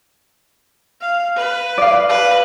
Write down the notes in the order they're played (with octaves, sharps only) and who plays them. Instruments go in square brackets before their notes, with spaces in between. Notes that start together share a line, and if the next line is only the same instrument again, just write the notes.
[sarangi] F5
B4
[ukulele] D5 F5
[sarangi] B4